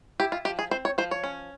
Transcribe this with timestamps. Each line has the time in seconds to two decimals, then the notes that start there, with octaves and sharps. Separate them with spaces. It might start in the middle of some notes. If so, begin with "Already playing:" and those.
0.20 E4 G4
0.32 F4
0.45 F3 G4
0.59 G#4
0.71 C4 C5
0.85 C#5
0.98 F3 C5
1.11 C#5
1.24 C#4